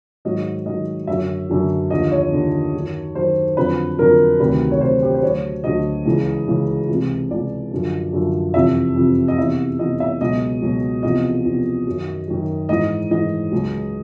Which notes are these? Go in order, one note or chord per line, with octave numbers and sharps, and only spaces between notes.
G#2 D#3 F#3 D#5
G#2 D#3 F#3 D#5
F#2 D3 F#3 E5
F#2 D3 F#3
D#2 D3 F3 D#5
C#5
D#2 D3 F3
F#2 D#3 F#3
F#2 D#3 F#3 C5
F2 D3 F#3 B4
F2 D3 F#3 A#4
D2 C3 D#3 F#3 B4
C#5
D2 C3 D#3 F#3 C5
G4
C5
D2 D3 F#3 C#5
D2 D3 F#3 D#5
C#2 C#3 E3
C#2 C#3 E3
C#2 C3 E3
C#2 C3 E3 D5
F#2 D3 F3
F#2 D3 F3
F2 C3 E3 E5
F2 C3 E3
D#5
E2 C3 E3 E5
E2 C3 E3 D#5
E5
C#2 B2 F#3 D#5
C#2 B2 F#3
E2 C3 F3 D#5
E2 C3 F3
F#2 D#3 F#3
F#2 D#3 F#3
G#2 E3 D#5
G#2 E3 D#5
C#2 C#3 F#3